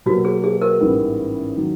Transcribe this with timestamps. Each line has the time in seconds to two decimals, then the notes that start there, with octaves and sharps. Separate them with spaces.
0.06 B2 F#3 A#3 F#4
0.25 G#4
0.44 G#4
0.62 A#4
0.80 A1 G#2 E3 G3 B3
1.56 D#3 F#3